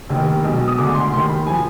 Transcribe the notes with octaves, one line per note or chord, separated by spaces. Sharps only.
F1 D#2 D#3
B1 B2 G#3
D#6
D2 D3 G#3 D6
C6
F1 D#2 D#3 G#3 C6
B5
F3 G#5